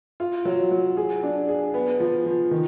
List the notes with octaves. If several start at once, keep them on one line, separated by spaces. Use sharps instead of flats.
F4
F#3
F#3
G#4
D4
G#4
B3
F3
F3
D#3